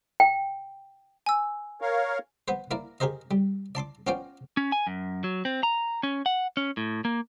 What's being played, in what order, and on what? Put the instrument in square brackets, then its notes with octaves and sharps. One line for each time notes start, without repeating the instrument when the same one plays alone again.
[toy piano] G5
[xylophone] G#5 E6
[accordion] A#4 C#5 F5
[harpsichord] B3 B4 C5
A#3 E4 A#4 D5
G4 G#4 A#4 C5 D#5
G3
D5 A5 C6 D6
B3 C#4 F4 C5 D5 G5
[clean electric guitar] C#4
G#5
F#2
F#3
C4
A#5
C#4
F#5
C#4
A2
A#3